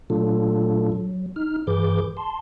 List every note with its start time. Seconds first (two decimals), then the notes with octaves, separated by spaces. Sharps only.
0.10 A#2 F#3 A3 D4 F4 A4
0.92 F#3
1.36 D#4 F6
1.67 G2 E3 G#4 B4 D6 G6
2.17 A5 C6